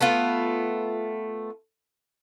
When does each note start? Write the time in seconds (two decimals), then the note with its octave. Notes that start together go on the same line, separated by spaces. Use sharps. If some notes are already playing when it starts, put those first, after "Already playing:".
0.01 A3 B3 F4